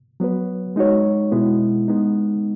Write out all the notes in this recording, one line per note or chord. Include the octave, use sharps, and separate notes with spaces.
F#3 B3 F#4 B4
G#3 D#4 F#4 C#5
B2 G#3 B3 E4
G#3 B3 D#4